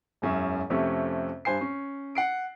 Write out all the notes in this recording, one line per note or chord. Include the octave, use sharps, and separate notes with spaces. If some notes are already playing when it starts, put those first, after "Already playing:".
E1 F#2 C#4 E5
F2 C3 A3 C#4
G2 C5 G#5 C7
C#4
F#5 C7 D7